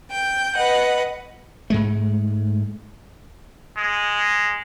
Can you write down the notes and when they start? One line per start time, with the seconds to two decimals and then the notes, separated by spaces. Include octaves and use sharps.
0.10 G5 G6
0.56 B4 D#5 F#5
1.70 G#2 G#3 A3
3.78 G#3